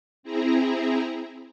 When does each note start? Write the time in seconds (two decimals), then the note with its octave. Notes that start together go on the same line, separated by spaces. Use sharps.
0.23 C4 E4 G#4 A#5